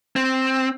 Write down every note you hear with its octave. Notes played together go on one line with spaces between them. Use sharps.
C4